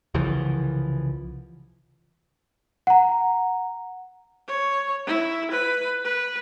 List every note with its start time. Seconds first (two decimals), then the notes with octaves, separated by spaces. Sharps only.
0.14 C2 C#3 E3 F3
2.87 F#5 A#5
4.47 C#5
5.07 E4
5.51 B4
6.05 B4